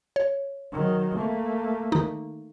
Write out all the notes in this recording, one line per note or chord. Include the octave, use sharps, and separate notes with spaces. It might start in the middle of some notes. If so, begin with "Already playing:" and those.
C#5
D#3 F#3
A3 A#3
D#3 D#4